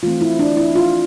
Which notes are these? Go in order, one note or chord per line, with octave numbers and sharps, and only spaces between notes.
E3 A3 C4 F4
E4
D4
E4
F4